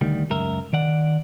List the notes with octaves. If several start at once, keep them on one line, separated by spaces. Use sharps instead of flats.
D2 D#3 G3
C#2 F#2 A#4 E5
D#3 D5 F#5